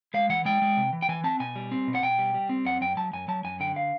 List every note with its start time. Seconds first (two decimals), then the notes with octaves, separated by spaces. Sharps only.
0.14 G#3 F5
0.29 E3 F#5
0.45 G#3 G5
0.62 G#3
0.77 C3
0.93 E3
1.02 G5
1.09 E3 G#5
1.24 C4 A5
1.40 B2 G#5
1.56 G3
1.72 C4
1.87 B2
1.95 F#5
2.03 B2 G5
2.19 G3
2.34 G3
2.49 C4
2.66 F#2 F#5
2.81 F#2 G5
2.97 F#3 A5
3.13 F#2 G#5
3.28 F#3 A5
3.44 F#2 G#5
3.60 D3 G5
3.76 F5